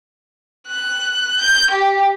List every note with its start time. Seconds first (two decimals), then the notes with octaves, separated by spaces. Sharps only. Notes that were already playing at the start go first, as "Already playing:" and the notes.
0.68 F#6
1.39 G6
1.71 G4